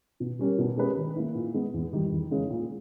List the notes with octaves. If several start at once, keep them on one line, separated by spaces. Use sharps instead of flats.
B2
G3 C#4 G4 A#4
B2
G#3 C#4 G4 B4
D#3
A#3 E4
A#2
G#3 B3
E2
D#3 G3
E2
C#3 G#3
A#2